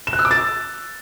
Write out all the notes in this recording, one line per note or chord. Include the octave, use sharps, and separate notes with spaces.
E7
F#6
E6
D6
A6